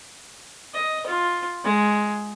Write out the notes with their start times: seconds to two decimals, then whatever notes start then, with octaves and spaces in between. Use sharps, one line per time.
0.74 D#5
1.07 F4
1.65 G#3